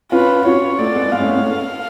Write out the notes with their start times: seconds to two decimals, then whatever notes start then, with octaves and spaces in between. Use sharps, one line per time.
0.12 C#4 F4 B4
0.42 F#4
0.45 C#4 F4 C#5
0.79 A3 D5
0.95 G#3 B3
1.12 G#3 B3 F5
1.20 A3 C#4
1.29 G#3 B3
1.37 A3 C#4